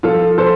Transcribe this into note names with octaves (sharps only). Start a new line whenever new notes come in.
F3 F4 A4
A4 C5